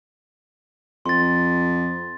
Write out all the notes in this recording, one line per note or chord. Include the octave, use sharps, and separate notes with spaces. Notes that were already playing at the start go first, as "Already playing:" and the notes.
F2 C6 A6